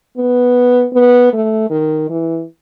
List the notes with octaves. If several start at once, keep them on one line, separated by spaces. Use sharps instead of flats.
B3
B3
A3
D#3
E3